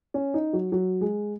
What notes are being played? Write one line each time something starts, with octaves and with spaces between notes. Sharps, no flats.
C#4
D#4
F#3
F#3
G#3